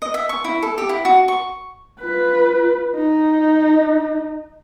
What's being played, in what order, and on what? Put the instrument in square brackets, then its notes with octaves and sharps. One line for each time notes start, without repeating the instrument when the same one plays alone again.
[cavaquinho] D#5
E5
C#6
E4
A4
G4
E4
F#4
C#6
[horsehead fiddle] F4 B4
D#4